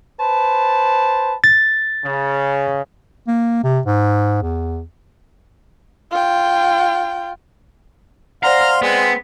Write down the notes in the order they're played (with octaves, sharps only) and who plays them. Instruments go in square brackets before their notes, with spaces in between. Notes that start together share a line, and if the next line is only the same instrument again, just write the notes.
[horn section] B4 C5 A5
[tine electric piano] A6
[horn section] C#3
[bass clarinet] A#3
C3
G#2
E2
[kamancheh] F4 G5
[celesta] C5 D5 F#5 [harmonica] F5 C6 F6 [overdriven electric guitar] A#5
[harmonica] G#3 C4 [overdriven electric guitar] B3